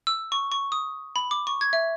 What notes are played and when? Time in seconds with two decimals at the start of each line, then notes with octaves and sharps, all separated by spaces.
0.07 E6
0.32 C#6
0.52 C#6
0.72 D#6
1.16 B5
1.31 D6
1.47 C#6
1.61 G#6
1.73 E5